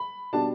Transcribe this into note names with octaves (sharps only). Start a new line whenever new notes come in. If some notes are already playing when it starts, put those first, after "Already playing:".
Already playing: B5
B2 G3 D4 A5